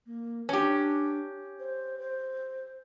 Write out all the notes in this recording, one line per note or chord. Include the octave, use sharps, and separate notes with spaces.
A#3
C#4 D4 G4
C5
C5